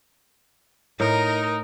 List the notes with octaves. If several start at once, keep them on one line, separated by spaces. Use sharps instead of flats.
A2 D#4 A#4